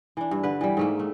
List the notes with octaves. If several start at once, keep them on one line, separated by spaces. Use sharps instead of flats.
E3 D4
G2
D3 B4
E3 G3
G#2 A3 A#3
A3